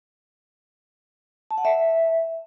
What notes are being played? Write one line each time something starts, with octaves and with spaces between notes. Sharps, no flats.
A5
F#5
E5